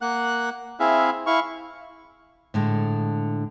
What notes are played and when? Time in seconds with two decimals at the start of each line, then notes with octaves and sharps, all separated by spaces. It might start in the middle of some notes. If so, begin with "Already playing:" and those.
0.01 A#3 F#5 F#6
0.80 C4 E4 G#4 E5 F5
1.26 E4 F5 C#6
2.54 A2 D3 G#3